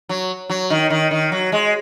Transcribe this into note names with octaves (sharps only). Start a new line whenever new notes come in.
F#3
F#3
D#3
D#3
D#3
F#3
G#3